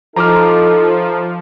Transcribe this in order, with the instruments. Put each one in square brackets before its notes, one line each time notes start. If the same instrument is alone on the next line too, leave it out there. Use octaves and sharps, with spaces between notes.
[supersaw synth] F3 [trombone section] D#4 E4 A4 [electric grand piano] A#5 D6 F6